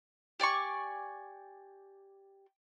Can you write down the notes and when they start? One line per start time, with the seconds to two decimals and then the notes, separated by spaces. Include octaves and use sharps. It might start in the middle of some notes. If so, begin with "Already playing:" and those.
0.40 G4 D5 G#5 C#6